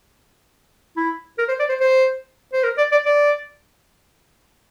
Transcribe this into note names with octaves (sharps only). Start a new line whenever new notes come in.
E4
A#4
C5
D5
C5
C5
C5
A#4
D5
D5
D5